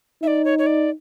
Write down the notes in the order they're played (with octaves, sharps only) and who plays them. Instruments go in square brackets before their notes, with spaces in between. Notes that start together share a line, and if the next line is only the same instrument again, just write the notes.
[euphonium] D#4 [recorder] E5
[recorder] D5
C#5
C#5
D5